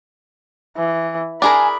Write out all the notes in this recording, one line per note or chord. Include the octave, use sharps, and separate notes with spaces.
E3
D4 G#4 A#4 G#5 B5